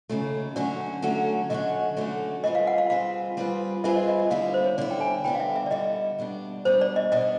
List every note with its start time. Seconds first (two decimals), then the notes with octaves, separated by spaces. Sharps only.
0.09 D#2 C#3 F#3 A3
0.56 D3 F#3 A3 C#4 F#4 D5
1.02 D3 F#3 A3 C#4 F#4
1.50 D3 F#3 A3 C#4 F#4 D#5
1.97 D3 F#3 A3 C#4 F#4
2.44 G3 C4 F4 G#4 B4 D#5
2.55 F5
2.67 F#5
2.78 F5
2.90 G3 C4 F4 G#4 B4 F5
3.37 G3 C4 F4 G#4 B4
3.84 G3 C4 F4 G#4 B4 E5
3.96 D#5
4.07 D#5
4.20 E5
4.30 D3 G3 B3 E4 F5
4.42 F5
4.54 C5
4.66 C#5
4.78 D3 G3 B3 E4 D5
4.91 G5
5.01 G#5
5.24 D3 G3 B3 E4 G5
5.35 F5
5.40 E5
5.56 E5
5.66 D5
5.71 D3 G3 B3 E4 D#5
6.19 B2 G3 B3 D4
6.65 B2 G3 B3 D4 C5
6.81 D5
6.96 D#5
7.12 B2 G3 B3 D4 D#5